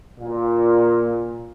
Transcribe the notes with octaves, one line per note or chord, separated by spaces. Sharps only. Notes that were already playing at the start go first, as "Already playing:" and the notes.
A#2